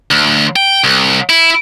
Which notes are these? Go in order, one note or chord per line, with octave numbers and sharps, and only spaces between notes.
D2
G5
C2
E4